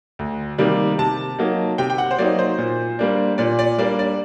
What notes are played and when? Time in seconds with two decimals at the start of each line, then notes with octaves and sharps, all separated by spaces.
0.19 D2
0.58 C3 D#3 G3 A#3
0.98 C3 A5
1.39 F#3 A#3 D#4
1.78 C3 G5
1.90 G5
1.98 F#5
2.11 C5
2.18 F#3 A#3 D#4 D5
2.39 C5
2.58 A#2
2.99 G3 A#3 D4
3.38 A#2 D5
3.59 D5
3.78 G3 A#3 D4 D5
3.99 D5